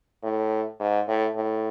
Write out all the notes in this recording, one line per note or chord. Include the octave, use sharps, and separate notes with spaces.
A2
G#2
A2
A2